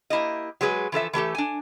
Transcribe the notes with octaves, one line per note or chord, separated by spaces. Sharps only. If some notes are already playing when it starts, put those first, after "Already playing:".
A#3 E4 G4 D#5
F#3 G#3 G#4 B4
E3 F3 A4 E5
E3 A3 G4 A4
D4 G#5